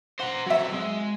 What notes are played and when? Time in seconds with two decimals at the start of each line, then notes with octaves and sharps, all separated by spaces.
0.20 C5 F#5 A#5
0.47 F#3 C4 F#4 E5
0.74 G#3